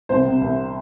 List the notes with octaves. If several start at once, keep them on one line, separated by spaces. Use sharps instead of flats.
C2 C5
C3
C2